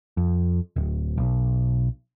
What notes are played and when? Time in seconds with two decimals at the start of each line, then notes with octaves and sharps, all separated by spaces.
0.17 F2
0.76 D1
1.18 B1